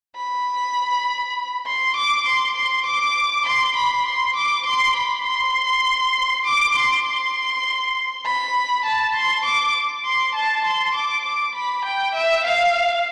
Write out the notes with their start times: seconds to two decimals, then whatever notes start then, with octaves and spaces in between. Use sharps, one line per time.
0.17 B5
1.67 C6
1.97 D6
2.27 C6
2.57 C6
2.86 D6
3.46 C6
3.76 B5
4.06 C6
4.36 D6
4.66 C6
4.96 B5
5.26 C6
6.46 D6
6.75 C6
7.06 C6
8.26 B5
8.86 A5
9.15 C6
9.45 D6
10.05 C6
10.35 A5
10.65 C6
10.94 D6
11.25 D6
11.55 B5
11.85 G5
12.15 E5
12.45 F5